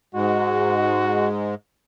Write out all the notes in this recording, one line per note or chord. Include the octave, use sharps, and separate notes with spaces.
G#2 G#3 F#4